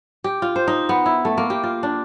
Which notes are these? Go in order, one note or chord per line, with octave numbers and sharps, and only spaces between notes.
G4
F4
C5
D#4
B3
E4
A3
A#3
G4
F4
D4